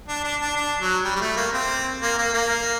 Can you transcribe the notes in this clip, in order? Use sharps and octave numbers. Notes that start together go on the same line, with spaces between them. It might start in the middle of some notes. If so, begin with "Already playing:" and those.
D4
D4
D4
D4
F#3
G3
G3
A3
A#3
C4
A#3
A#3
A#3